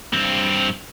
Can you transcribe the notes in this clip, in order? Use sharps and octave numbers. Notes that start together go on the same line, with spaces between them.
G2 C4